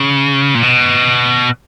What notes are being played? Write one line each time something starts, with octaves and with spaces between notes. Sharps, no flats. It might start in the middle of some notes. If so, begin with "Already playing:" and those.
Already playing: C#3
A#2
B2